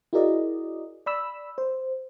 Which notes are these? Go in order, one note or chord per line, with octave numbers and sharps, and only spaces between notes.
E4 F#4 G#4 A#4 D5 D#5
D5 B5 E6
C5